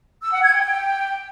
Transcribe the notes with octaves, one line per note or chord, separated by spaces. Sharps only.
E6
F#5
G#6
G5
G5